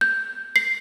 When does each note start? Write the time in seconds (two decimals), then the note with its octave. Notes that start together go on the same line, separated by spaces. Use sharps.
0.01 G6
0.56 C7